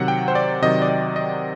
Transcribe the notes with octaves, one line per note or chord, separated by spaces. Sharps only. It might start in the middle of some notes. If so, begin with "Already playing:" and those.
Already playing: C3 D#3 F#3 F#5
G5
C5
D5
C3 D#3 F#3 D#5
D5
D#5
D#5